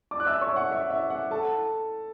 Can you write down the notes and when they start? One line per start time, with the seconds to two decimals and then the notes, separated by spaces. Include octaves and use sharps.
0.11 D5 D6
0.20 F#6
0.26 E5 E6
0.41 C#5 C#6
0.56 F#5
0.72 E5
0.90 E5
1.10 F#5
1.31 A4 A5